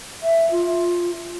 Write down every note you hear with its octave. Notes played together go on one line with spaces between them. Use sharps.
E5
F4